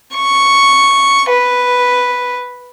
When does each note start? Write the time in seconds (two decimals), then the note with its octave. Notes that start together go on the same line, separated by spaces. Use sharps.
0.14 C#6
1.29 B4